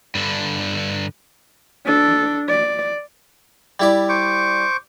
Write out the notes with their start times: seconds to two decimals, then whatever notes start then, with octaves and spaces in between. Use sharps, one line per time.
0.15 G2 D3
1.85 D4 A4
2.48 D5
3.80 G3 E4 D5
4.09 C5 C#6 D6